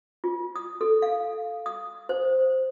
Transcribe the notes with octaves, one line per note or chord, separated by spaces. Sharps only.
F4
D#6
A4
F5
D#6
C5